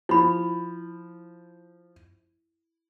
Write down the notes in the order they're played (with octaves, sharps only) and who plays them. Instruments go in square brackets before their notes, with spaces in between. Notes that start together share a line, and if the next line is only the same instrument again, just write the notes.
[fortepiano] F3 [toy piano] E4 B5